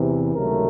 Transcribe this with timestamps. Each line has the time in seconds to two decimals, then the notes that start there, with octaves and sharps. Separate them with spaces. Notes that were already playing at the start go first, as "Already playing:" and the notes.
Already playing: E2 C3 E3
0.34 C#2 C3 D#3 F#3 A3 A#4